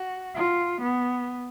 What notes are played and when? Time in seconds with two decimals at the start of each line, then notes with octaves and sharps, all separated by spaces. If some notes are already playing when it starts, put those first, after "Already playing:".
Already playing: F#4
0.35 F4
0.81 B3